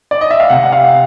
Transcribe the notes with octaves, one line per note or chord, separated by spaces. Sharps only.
D5
D#5
E5
F5
C3 F#5
F#5
F5